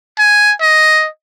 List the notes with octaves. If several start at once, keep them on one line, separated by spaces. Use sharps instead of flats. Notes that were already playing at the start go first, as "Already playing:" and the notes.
G#5
D#5